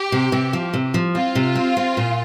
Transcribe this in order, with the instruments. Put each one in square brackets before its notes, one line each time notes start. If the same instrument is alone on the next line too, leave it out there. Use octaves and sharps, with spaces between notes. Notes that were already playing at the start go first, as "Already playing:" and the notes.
Already playing: [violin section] G4
[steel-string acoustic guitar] C3
C3
F3
C3
F3
[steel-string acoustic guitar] C4 [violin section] F4
[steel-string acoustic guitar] C3
C4
C4
A#2